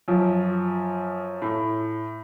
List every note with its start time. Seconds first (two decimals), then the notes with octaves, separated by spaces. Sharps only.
0.08 F#2 F3
1.42 A2